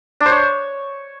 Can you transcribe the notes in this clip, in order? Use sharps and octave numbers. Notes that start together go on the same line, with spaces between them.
D4
C5
C#5